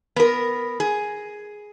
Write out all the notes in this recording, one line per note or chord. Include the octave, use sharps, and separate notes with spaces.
B3 A#4
G#4